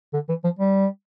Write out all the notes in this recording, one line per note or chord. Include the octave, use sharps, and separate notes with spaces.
D3
E3
F3
G3